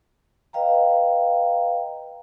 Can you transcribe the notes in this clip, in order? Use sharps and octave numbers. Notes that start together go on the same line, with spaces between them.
B4 D#5 F5 G5 A#5